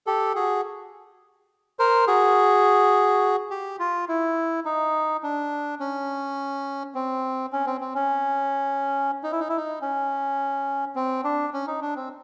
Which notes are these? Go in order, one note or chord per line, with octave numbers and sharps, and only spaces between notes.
G4 A4
F#4 G#4
A#4 C5
F#4 G#4
G4
F4
E4
D#4
D4
C#4
C4
C#4
C4
C4
C#4
D#4
E4
D#4
E4
D#4
C#4
C4
D4
C#4
D#4
D4
C4